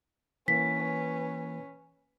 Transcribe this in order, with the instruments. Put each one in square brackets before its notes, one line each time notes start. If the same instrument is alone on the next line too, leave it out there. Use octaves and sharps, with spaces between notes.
[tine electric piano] E3 A#3 [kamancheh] C#4 B4 [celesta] B6